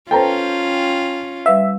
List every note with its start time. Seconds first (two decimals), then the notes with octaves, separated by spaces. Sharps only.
0.11 C#4 F4 A4 B4 C5 G5 A5 A#5
1.46 G3 B4 E5 F5